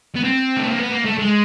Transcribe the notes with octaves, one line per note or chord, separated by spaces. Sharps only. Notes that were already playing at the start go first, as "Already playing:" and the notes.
B3
C4
A3
A#3
B3
A#3
A3
G#3